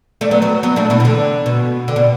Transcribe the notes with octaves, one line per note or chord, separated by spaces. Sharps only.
A3 D4
F#3 B3
F#3 B3
F#3 B3
A3 D4
B2 E3
B2
D3
B2
D3
B2